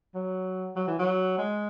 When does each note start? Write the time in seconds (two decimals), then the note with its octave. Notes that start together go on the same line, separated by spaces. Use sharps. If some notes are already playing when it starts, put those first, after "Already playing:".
0.15 F#3
0.76 F#3
0.87 E3
0.99 F#3
1.38 G#3